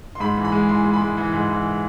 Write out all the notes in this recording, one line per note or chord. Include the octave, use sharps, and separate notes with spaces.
C6
G#2 B5
E3
B5
G#3
E3 C6
G#3
B5
G#3
E3
G#2
E3